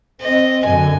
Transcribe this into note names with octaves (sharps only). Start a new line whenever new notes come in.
C4 D#5
F#2 D3 G#5